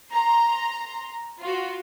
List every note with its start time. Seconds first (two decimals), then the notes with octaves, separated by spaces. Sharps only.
0.11 A#5 C6
1.39 F4 F#4